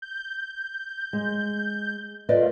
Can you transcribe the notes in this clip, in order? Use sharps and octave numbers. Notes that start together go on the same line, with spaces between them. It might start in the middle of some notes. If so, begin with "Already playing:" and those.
G6
G#3
A3 F4 B4 D5 D#5